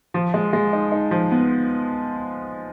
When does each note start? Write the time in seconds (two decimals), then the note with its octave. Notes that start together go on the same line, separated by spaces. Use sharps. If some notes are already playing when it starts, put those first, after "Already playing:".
0.14 F3
0.34 G#3
0.53 G#3
0.73 D#4
0.92 D#4
1.11 F3
1.31 B3